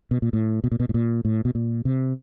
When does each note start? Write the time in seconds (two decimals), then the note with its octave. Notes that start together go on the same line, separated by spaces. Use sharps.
0.11 B2
0.22 A#2
0.33 A2
0.64 B2
0.72 A#2
0.80 B2
0.89 A2
0.94 A#2
1.25 A2
1.45 B2
1.55 A#2
1.85 C3